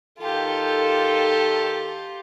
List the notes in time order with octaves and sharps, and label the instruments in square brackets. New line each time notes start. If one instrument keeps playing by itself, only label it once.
[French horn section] D#3 A4 [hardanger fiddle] F4 G4